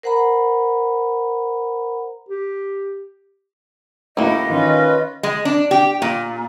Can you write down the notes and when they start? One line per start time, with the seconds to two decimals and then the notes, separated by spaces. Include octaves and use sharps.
0.03 A#4 C5 F#5 A#5 B5
2.29 G4
4.17 C#2 A3 A#3 E4 F#4 D#5
4.50 D#3 C#4 F4 B4
5.23 G#3
5.45 D4
5.71 G4
6.02 A#2